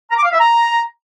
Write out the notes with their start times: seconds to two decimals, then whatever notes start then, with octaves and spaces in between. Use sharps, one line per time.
0.11 A#5
0.18 D6
0.25 F5
0.32 E5
0.39 A#5